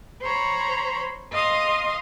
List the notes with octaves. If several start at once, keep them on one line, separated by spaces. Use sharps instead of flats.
C5 C#5 A#5 B5
D#5 F5 C6 D#6